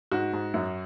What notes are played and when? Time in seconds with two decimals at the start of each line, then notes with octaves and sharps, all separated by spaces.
0.11 G#2 F#4
0.33 G#2
0.54 F#2